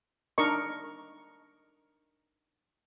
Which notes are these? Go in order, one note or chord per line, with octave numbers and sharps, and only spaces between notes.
D4 D#4 A#4 D#5 C#6